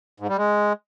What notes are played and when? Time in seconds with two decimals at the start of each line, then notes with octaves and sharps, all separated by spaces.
0.20 G#2
0.29 G3
0.37 G#3